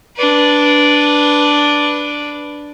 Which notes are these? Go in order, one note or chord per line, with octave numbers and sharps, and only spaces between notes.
D4 B4